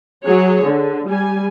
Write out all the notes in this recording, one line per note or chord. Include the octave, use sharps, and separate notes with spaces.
F#3 G#4 C#5
D3
G3 G#5